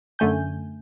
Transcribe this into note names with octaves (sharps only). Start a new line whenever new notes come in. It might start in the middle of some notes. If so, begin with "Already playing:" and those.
F#2 D3 A3 G#5 G6